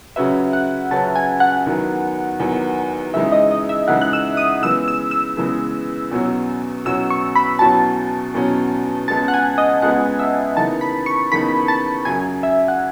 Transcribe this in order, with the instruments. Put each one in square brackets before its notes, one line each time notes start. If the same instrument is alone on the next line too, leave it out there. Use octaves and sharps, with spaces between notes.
[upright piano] C#3 F#3 C#4 F#4 B4 [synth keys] E5
[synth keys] F#5
[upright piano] C#3 F#3 C#4 F#4 B4 [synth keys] A5
[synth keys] G#5
F#5
[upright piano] E2 D#3 F#3 B3
E2 D#3 F#3 B3
[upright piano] C#3 E3 G#3 D#4 [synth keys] E5
[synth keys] D#5
D#5
E5
[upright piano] C#3 E3 G#3 D#4 [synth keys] F#5
[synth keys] F#6
E6
D#6
[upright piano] C#3 E3 G#3 B3 [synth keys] E6
[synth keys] E6
E6
[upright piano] C#3 E3 G#3 B3
E2 B2 F#3 C#4 F#4
[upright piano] E2 B2 F#3 C#4 F#4 [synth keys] E6
[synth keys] C#6
B5
[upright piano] E2 B2 F#3 C#4 F#4 [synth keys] A5
[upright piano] E2 B2 F#3 C#4 F#4
[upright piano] C#2 C#3 G#3 B3 [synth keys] A5
[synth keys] F#5
G#5
D#5
[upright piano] C#2 C#3 G#3 B3 [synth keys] F#5
[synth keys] E5
[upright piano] D#2 C#3 E3 B3 D#4 [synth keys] A5
[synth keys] B5
C#6
[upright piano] D#2 C#3 E3 B3 D#4 [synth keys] B5
[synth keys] A5
[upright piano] F#2 C#3 F#3 [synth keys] G#5
[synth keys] E5
F#5